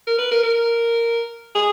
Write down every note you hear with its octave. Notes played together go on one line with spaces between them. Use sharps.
A#4
B4
A#4
A#4
G#4